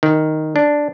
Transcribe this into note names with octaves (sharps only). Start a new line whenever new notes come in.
D#3
D4